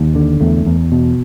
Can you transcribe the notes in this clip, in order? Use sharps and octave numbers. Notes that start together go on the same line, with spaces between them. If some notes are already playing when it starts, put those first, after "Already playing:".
Already playing: D#2
D3
E2 A3
E2
B2